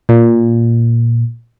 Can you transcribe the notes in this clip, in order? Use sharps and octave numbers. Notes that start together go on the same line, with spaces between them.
A#2